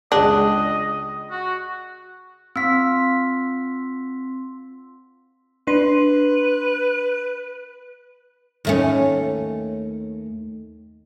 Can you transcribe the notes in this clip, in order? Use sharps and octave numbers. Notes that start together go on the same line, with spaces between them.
C#2 G#3 D4 D#5 F#6
F#4
C4 F4 E6 B6
D4 B4 C6
D#2 A3 C#4